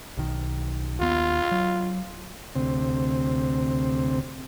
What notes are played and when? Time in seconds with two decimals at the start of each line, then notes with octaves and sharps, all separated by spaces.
0.17 B1 D#3
1.00 D#2 B3 F4
1.51 F#3
2.55 D2 C3 C4